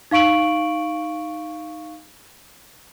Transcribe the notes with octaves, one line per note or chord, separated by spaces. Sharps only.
D#4 F5 C#6 D7 F#7